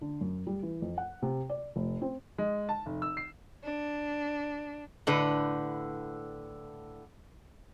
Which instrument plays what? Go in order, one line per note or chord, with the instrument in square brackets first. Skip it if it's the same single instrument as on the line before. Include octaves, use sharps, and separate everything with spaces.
[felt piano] D3
F#2
G3
E3
F2
F#5
C3
D5
F1
C4
[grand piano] G#3
A5
F1
E6
C7
[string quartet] D4
[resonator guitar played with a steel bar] A2 D3 B4